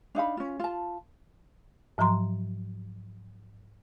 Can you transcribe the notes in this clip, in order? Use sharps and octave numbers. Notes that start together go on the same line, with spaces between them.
D4 D#4 F5 B5
C#4 F4
F4 A5
G#2 F3 F#3 A#5 C6